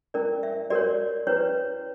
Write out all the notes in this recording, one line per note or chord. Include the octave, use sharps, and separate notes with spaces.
C#4 E4 A#4 D5
E5
F#4 A#4 C#5 D5
C#4 E4 B4 C#5